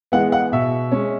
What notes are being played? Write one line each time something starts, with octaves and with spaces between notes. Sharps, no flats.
E3 G#3 B3 F#5
F#5
B2 E5
G#3 C#4